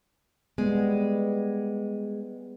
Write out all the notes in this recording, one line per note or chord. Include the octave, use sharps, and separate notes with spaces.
G3 G#3 B3